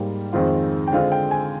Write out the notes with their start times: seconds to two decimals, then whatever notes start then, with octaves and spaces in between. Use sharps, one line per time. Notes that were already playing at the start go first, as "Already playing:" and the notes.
Already playing: G#2 G3 A#3
0.33 F2 D#3 G#3 C4 F4
0.88 G5
0.92 D3 G#3 C4 F4 F5
1.12 G5
1.31 G#5